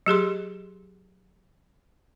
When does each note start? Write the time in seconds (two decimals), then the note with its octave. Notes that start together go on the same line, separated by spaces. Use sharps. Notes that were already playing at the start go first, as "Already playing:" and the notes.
0.06 F#3 G4 G#4 C6